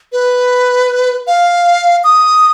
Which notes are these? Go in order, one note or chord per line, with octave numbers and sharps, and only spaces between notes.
B4
F5
D#6